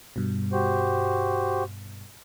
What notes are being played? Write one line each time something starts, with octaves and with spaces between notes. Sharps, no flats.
G2 B2
F#4 G4 C5